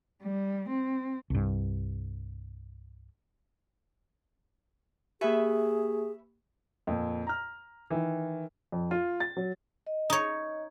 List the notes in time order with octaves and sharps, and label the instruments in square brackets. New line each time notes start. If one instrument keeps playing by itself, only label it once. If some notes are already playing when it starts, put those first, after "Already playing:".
[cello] G3
C4
[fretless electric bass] C2 G2
[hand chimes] A#3 G4 [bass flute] G#4 [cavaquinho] B4 E5 G#5
[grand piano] F2 A#2
A#5 F6
D#3 E3
[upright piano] F2
F4
A6
F#3
[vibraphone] D#5
[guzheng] D#4 C#5